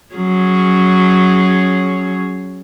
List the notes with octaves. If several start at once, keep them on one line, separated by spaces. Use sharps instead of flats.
F#3 C#4 G#4